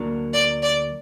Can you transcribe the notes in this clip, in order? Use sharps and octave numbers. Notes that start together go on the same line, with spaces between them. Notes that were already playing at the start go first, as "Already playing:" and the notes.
Already playing: D2 D3 F#3 A#3 D4
D5
D5